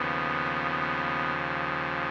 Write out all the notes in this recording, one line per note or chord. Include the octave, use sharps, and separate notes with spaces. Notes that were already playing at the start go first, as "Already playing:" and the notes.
Already playing: D#2 C#3 F3 B3